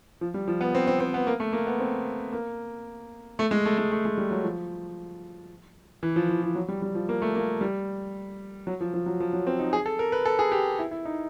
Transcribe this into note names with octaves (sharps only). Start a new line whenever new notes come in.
F3
G3
F3
B3
C4
C4
C4
B3
A#3
A3
A#3
B3
C4
A#3
A3
G#3
A3
G#3
A3
G#3
G3
F#3
F3
E3
F3
E3
F3
F#3
G3
G3
F3
A#3
A3
A#3
G3
F#3
F3
F3
F#3
F3
F#3
C4
D#4
G#4
A4
A#4
B4
A4
G#4
G4
E4
E4
D#4